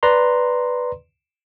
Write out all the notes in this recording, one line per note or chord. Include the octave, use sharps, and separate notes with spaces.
B4 D5 A#5 C6